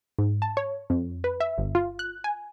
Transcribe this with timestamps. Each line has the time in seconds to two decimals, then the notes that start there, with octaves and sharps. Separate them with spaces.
0.19 G#2
0.42 A5
0.57 C#5
0.90 F2
1.24 B4
1.40 E5
1.58 G1
1.75 F4
1.99 F#6
2.24 G#5